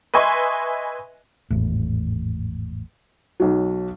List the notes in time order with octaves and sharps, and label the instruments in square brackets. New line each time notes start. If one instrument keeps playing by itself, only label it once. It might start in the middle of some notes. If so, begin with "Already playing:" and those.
[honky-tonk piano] B4 D#5 E5 G#5 C6 C#6
[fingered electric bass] G#1 E2 A2
[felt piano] B1 F#3